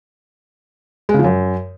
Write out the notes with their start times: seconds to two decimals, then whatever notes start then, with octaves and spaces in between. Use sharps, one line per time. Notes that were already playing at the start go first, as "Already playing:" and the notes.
1.09 G#3
1.14 C#3
1.19 F3
1.24 F#2